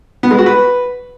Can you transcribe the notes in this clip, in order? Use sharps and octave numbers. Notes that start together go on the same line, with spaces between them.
B3
G#3
F#4
B4